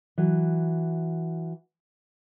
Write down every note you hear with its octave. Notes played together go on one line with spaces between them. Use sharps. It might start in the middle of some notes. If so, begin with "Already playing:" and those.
E3 F#3